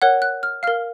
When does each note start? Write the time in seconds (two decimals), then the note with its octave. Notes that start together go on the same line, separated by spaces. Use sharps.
0.02 A#4 C#5 F#5 F#6
0.22 F#6
0.43 F6
0.63 A#4 F5 F6